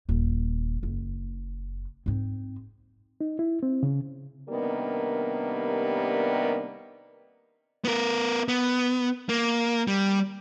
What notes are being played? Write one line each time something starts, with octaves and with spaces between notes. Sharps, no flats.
D#1
F#1
G#2 C4
D#4
E4
C4
C#3
C3 D#3 G3 A#3 B3 D4
B3 A#4
B3
A#3
G3